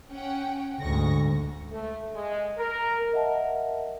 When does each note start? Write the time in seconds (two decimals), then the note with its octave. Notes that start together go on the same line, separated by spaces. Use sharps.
0.11 C#4 F#5 G5
0.80 D2 G#2 C#6 A#6
1.71 A3
2.14 G#3
2.57 A#4
3.12 A#4 D#5 E5 F#5 A5